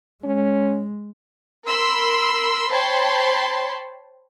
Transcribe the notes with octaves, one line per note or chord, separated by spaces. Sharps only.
G#3 C#4
A#4 B5 C6 E6
C5 C#5 G5 A5 B5 C6